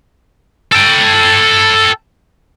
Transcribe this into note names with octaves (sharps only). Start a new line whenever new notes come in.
A4 G5